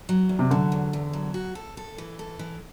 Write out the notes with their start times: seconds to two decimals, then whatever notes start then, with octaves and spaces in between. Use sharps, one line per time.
0.09 F#3
0.29 E2
0.39 C3
0.51 D3 F#3
0.72 E2
0.93 E2
1.13 F#3
1.34 F#4
1.55 A4
1.77 A4
1.98 E3
2.19 A4
2.39 E3